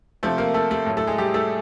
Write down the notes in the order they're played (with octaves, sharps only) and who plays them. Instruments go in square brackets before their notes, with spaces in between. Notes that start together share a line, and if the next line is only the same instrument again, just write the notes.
[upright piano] C3 F3 A3 A4
A#3 A#4
A3 A4
A3 A4
A2 F#3
A3 A4
G#3 G#4
G3 G4
A3 A4